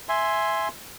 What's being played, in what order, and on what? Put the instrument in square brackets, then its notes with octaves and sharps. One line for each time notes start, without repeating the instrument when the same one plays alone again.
[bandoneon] E5 G#5 C6